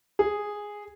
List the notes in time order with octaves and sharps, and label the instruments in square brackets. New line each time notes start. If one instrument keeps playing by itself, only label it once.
[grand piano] G#4